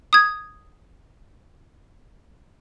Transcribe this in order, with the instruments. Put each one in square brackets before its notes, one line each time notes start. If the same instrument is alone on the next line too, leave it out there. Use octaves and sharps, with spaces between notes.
[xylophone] D#6 G#6